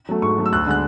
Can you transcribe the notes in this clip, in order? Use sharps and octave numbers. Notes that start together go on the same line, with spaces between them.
F#3 A3
G#2 C#6
F#3 A3
E6
D2 F#6
D3 G#3 F#6